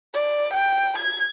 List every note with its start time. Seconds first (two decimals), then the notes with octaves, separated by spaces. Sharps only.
0.15 D5
0.54 G5
0.98 G#6